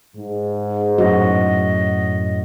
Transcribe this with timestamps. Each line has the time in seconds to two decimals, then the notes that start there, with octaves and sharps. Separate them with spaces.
0.16 G#2
0.98 F#2 A2 F#4 D#5